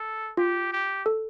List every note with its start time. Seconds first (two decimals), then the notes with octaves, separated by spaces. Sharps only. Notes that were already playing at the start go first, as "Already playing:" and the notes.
Already playing: A4
0.37 F4 G4
0.72 G4
1.06 A4